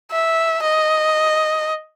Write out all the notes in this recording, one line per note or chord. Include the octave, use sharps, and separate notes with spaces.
E5
D#5